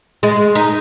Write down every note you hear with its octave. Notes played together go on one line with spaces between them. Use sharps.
G#3
D#4